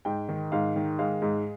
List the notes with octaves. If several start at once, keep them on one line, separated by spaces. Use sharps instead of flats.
G#2 G5
D#3
G#2 F5
D#3
G#3 F5
G#2